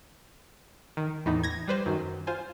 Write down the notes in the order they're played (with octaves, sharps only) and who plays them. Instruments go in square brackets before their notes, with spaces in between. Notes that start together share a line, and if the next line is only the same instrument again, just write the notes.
[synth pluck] D#3
E2 A2 E3 B3 D#4
G#6 A#6
G3 B4 C5
F#2 D#3 F#3
F4 C5 G#5